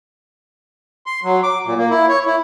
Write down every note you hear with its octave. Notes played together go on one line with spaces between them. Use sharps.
C6
F#3
D6
A#2
A#3
E4
C#5
E4